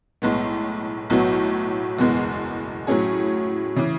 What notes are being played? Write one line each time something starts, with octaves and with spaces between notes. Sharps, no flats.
B1 A2 G#3 B3
B1 A2 F#3 B3 F#4
F#1 E2 B2 G#3 B3
A2 F#3 C#4 G#4
C#3 E3